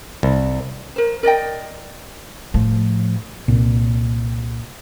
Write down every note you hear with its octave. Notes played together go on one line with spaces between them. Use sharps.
C2
A#4 C5
A#4 D5 D#5 G5
A2 F3
C2 A#2